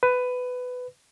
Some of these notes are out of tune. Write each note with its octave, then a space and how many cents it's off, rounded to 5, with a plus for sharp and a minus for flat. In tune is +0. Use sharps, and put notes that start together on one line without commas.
B4 +15